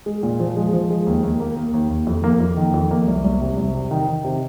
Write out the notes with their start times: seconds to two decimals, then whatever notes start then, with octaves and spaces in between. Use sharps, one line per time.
0.06 G#3
0.23 A#2
0.40 F3
0.56 G#3
0.73 F3
0.90 G#3
1.07 D#2
1.24 D#2
1.40 A#3
1.57 A#3
1.74 D#2
1.90 D#2
2.07 F2
2.24 A#3
2.40 F2
2.57 D#3
2.74 F2
2.91 A#3
3.07 C2
3.25 C2
3.41 C3
3.57 C2
3.74 C3
3.91 D#3
4.08 D#3
4.24 C3